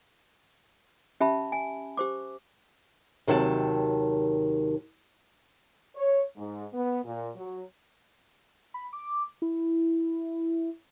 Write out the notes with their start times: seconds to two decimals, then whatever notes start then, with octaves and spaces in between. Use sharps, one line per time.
1.20 C#4 G4 E5 A5 B5
1.52 G#5
1.97 G4 C5 D6
3.27 D#2 C3 D#3 F#3 G4 A5
5.96 C#5
6.37 G#2
6.72 B3
7.04 A#2
7.35 F#3
8.74 B5
8.93 D6
9.42 E4